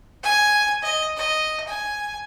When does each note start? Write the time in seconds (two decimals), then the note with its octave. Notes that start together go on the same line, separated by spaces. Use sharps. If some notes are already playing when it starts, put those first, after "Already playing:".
0.23 G#5
0.82 D#5
1.17 D#5
1.68 G#5